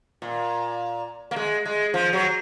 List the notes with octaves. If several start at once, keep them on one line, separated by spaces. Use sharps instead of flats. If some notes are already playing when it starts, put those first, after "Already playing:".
A#2
A#3
G#3
G#3
F3
F#3